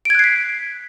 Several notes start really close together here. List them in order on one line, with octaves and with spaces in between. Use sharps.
D7 G#6 F#6 C7 B6